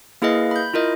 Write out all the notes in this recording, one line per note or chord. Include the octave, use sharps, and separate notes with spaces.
A#3 E4 G#4 B4 D#5 F5
B5 G6
E4 F4 A#4 D#5